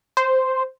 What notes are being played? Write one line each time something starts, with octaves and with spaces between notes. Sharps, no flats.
C5